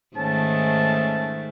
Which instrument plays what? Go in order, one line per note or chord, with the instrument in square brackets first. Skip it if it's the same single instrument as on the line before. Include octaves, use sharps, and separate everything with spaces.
[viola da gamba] G#2 D#3 A3 [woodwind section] C#4 A5